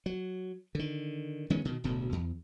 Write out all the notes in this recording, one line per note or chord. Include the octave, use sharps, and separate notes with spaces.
F#3
D3 D#3
D#3 G#3 B3 C#4
B2 D#3
D1 D2 B2
E2